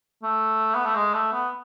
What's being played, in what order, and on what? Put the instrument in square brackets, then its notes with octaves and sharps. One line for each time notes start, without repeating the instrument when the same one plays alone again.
[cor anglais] A3
B3
A3
G#3
A3
B3